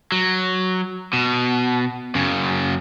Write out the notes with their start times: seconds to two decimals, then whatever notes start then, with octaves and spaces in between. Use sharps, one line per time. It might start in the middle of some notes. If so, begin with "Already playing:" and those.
0.12 F#3
1.13 B2
2.15 F#2 C#3